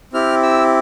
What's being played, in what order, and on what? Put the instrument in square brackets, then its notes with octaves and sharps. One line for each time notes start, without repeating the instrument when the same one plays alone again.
[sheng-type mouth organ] C4 E4 G4 F6
E6